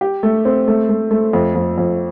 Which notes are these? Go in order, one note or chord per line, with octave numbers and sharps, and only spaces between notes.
G4
A3
C4
A3
A3
A3
F2
F2
F2